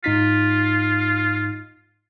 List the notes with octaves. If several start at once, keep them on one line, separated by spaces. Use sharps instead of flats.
G#2 D#4 F4 B6